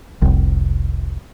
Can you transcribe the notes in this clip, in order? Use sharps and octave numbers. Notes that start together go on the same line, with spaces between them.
F1 C2